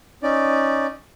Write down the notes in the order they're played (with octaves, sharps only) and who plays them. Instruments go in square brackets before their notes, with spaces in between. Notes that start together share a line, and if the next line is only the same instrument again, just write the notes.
[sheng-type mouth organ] C#4 D#4 D5